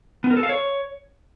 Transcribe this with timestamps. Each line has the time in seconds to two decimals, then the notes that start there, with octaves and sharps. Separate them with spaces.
0.24 B3
0.30 A#4
0.37 A4
0.43 F5
0.49 C#5